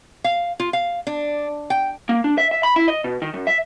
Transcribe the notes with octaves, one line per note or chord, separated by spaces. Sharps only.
F5
F4
F5
D4
G5
A#3
D4
E5
E5
B5
E4
D#5
B2
D#3
F#2
E5